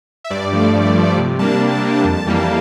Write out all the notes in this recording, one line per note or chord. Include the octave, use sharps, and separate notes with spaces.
E5
G2 D5
F3 A3
G2
F3 A3
C3
G3 A#3 D4 A5
C3
G3 A#3 D4
F2
E3 G3 A#3